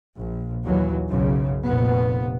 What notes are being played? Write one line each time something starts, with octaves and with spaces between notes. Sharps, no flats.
A#1
D#2 E3 F#3
B1 F#2 C#3
F1 A#2 B3